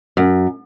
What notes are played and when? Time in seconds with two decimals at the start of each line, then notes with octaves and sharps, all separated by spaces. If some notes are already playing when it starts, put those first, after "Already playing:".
0.17 F#2